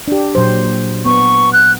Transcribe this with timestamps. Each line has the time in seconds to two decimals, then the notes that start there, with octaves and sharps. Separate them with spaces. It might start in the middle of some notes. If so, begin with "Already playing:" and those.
0.08 D4 G4
0.35 A#2 F#3 C5
1.05 B3 C#6
1.53 F#6